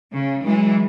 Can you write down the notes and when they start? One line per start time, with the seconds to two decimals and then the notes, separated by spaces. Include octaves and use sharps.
0.12 C#3
0.45 E3 F#3 G#3